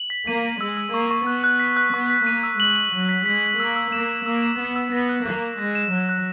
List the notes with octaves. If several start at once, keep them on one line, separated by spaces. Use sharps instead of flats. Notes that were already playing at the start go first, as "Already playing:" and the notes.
Already playing: F#7
B6
A#3 D#7
D#7
G#3 E6
E6
A#3 C#6
C#6
B3 F#6
F#6
B6
F#6
B3 C#6
B6
A#3 D#7
E6
G#3 F#7
F#7
F#3 B6
B6
G#3 B6
B6
A#3 E6
E6
A#3 E7
E7
A#3 E6
E7
B3 E7
E6
B3 A#6
F#6
A#3 F#6
E7
G#3 A#6
E7
F#3 F#6
F#6